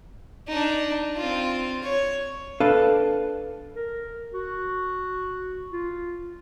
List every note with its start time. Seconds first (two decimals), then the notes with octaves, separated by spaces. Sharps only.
0.48 D4 D#4
1.16 C4 F4
1.83 C#5
2.60 D4 A4 B4 F5
3.76 A#4
4.34 F#4
5.71 F4